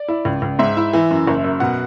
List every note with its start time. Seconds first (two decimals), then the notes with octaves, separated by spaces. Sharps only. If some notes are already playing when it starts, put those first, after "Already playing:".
Already playing: D5
0.08 E4
0.25 C#2
0.42 C#2
0.59 G#2 E5
0.77 E4
0.93 E3
1.11 F#2
1.27 F#1
1.44 F#2
1.60 B2 F#5